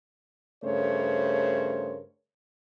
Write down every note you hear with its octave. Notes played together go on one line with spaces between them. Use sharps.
G2 C#3 A3 A#4 C5 C#5